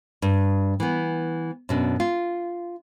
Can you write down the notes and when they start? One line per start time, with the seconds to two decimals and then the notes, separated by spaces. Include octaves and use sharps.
0.22 G2
0.80 E3 B3
1.69 F#2 B2 D4
2.00 F4